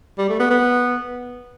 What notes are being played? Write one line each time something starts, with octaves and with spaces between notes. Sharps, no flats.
G3
A3
B3
B3